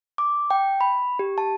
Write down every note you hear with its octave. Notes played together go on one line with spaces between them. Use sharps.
D6
G5
B5
G4
A5